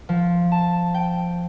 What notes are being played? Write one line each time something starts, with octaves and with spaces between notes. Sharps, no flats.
F3
A5
G5